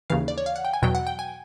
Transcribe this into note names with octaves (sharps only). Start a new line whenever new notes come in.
D#2 C#3 E3 F5
D5
C#5
F5
F#5
G5
G#5
E2 B2 F#3 G5
F#5
G5
G#5